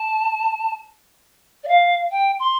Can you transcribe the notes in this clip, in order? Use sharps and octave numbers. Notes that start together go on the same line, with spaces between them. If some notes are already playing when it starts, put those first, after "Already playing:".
Already playing: A5
D5
F5
G5
C6